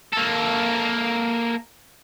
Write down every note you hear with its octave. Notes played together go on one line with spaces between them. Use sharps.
A#3 A4